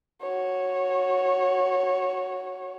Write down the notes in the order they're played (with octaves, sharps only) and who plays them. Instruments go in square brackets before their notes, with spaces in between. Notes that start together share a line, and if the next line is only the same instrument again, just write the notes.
[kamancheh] F#4 C#5